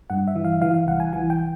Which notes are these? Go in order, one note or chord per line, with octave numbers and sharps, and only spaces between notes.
G2 F#5
E5
E3
F5
E3 F5
F5
C2 F#5
G#5
E3 G#5
G5